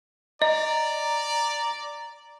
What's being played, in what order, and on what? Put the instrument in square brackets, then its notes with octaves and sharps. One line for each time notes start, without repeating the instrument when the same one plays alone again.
[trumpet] D5 [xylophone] D#5 [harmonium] A#5